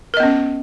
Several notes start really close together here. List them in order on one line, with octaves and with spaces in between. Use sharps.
A#4 D#5 B3 C#4